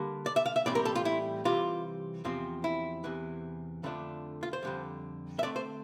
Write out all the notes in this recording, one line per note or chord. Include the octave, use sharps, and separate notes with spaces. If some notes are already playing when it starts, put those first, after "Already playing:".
Already playing: D3 G3 A#3
D5
E5
F5
E5
A2 E3 G3 C4 D5
A#4
A4
F4
E4
C3 E3 G3 F4
E2 C3 F3 C4
E4
E2 C3 E3
F2 D3 F3 A3 D4
F4
C5
F2 D3 G3
E5
D3 A3 C4 D5
C5